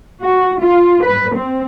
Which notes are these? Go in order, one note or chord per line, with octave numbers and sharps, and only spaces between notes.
F#4
F4
B4
C4